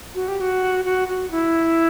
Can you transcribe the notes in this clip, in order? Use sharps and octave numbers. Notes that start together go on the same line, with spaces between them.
F#4
G4
F#4
F#4
F#4
E4